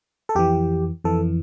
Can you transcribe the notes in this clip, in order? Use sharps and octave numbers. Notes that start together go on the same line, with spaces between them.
A4
F2 E3 G4
F2 E3 A4